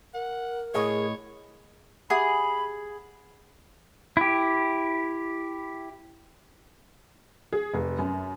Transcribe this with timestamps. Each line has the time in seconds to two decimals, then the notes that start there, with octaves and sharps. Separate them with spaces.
0.14 A#4 F#5
0.74 A2 G#4 C#5 D#5
2.10 G4 G#4 E5 F#5 B5
4.17 E4 G4
7.53 G#4
7.74 F1
7.98 F#2